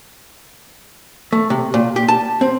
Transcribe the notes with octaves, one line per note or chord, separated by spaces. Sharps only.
A3
C3
A#2
G4
A5
C4